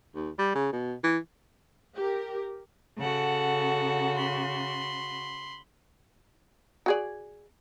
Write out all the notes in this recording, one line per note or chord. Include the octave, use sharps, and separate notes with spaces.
D#2
G3
C#3
B2
E3
G4 A#4
C#3 F#4 A4 F#5
B5 C6
F#4 G#4 D5